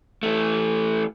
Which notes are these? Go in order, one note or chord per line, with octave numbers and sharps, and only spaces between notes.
E3 A3